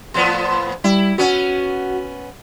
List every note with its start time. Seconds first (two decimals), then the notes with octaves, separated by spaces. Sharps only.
0.14 A2 F3 B3 C6
0.84 G3 E4
1.18 B3 C#4 F#4